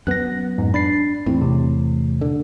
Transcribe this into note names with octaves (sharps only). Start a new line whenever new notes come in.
F#2 B3 F#6 A#6
F2 G#2
D4 B5 A6 C7
E2 A2 C4
C3
D3